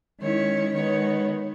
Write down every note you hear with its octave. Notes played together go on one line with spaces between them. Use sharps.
D#3 G#3 C#4 E4 C#5
D#3 G#3 B3 D#4 C#5